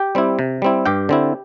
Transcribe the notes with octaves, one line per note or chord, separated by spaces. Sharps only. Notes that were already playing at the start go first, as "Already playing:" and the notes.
Already playing: G4 G5
G3 C4 E4
C3
G3 C4 E4
G2 G4 G5
D3 C4 E4